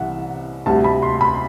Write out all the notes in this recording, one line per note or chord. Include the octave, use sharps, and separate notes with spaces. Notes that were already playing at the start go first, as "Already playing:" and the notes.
Already playing: C2 C3 E3 G3 E5 F#5
D2 C3 G3 A5
B5
C6
B5